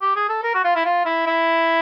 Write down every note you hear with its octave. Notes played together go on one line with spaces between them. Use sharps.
G4
G#4
A4
A#4
F#4
F4
E4
F4
E4
E4